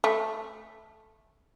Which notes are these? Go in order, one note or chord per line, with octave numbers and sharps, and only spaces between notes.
A3